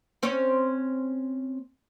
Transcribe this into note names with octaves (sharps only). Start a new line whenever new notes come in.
C4 C#4 C#5